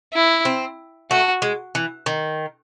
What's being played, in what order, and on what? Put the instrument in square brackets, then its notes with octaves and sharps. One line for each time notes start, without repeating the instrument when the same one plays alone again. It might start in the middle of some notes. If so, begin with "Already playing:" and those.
[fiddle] E4
[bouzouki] C4
[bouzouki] A3 [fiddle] F#4
[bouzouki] G#3
E3
D#3